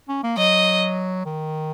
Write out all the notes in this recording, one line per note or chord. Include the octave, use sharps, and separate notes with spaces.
C#4
A#3
F#3 D#5
D#3